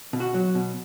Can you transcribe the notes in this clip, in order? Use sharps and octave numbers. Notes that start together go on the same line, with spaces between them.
B2
F#4
F#3
B2